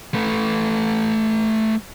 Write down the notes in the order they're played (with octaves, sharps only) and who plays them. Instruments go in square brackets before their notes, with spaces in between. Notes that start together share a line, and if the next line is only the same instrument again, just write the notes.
[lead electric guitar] A3 B4